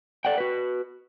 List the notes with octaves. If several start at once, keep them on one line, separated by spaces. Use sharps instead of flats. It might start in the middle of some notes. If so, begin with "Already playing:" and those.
A4 D5 F#5 G5
F#4 B4